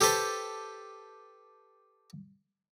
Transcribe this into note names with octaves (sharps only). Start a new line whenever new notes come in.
G4 A4 B4 C5 A5